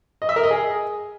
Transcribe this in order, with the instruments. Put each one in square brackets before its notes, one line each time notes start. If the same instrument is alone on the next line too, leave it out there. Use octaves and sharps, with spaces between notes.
[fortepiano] D#5
E5
A#4
D#5
G#4